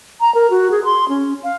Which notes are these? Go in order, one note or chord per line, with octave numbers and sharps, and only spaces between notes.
A#5
A#4
F#4
G#4
C6
C#4
F5